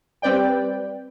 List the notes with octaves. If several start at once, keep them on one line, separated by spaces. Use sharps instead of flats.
G3 C4 B4 D5 G5